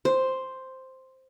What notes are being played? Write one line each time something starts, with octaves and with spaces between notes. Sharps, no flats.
C5